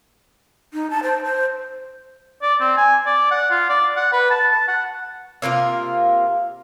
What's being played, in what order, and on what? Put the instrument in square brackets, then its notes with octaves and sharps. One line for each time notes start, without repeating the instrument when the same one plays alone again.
[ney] D#4
A5
C5
C5
[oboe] D5
C4
G#5
D5
F#5
F4
D5
F#5
B4
A5
A5
F#5
[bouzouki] C3 A#3 F4 A#4